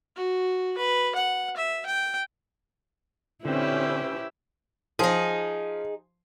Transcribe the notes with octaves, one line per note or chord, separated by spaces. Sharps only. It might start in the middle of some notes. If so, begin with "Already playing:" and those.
F#4
B4
F#5
E5
G5
D3 C4 C#4 E4 G4 B4 C5
F3 D#4 G#4